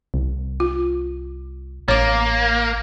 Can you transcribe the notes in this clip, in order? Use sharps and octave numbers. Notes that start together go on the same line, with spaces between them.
C2
F4
A1 A#3 C#5 D6